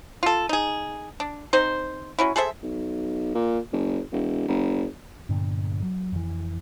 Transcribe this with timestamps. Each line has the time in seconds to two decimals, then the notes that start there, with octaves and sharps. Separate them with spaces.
0.23 F4 A4
0.49 D#4 G#4
1.20 D4
1.53 C4 D#4 C5
2.19 F#3 C#4 E4
2.36 G#4 A4 C5 E5
2.63 B1
3.35 A#2
3.73 F#1
4.12 E1
4.48 F#1
5.29 G2 A#2 D3 B3
5.82 F#3
6.12 F2 E3